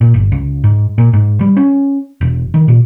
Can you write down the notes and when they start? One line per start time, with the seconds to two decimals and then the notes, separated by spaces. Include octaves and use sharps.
0.01 A#2
0.14 G1
0.32 C#2
0.64 G#2
0.98 A#2
1.13 G#2
1.41 G3
1.57 C#4
2.21 E1
2.54 D#3
2.68 A#2